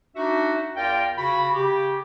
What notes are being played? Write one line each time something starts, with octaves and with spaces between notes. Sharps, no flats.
D4 D#4 F#4 E5
E2 F4 A#4 D5 F5 G5
C#3 F#4 B5
C#3 G4